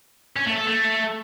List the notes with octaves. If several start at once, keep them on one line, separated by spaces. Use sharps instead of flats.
C#4
A3
A4
A3